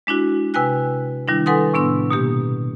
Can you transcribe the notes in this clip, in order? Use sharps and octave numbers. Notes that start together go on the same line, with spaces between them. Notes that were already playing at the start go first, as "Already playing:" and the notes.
G#3 D4 E4 F#4
C3 B4 G5 G#5 F#6
D#3 G3 D4 E4
A4 B4 F#5 G#5 C6 D#6
A2 C3 B3 D4 C6 E6
B2 A#3 G4